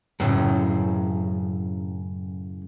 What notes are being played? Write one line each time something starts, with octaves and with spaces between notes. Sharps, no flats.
F#2 A2 C#3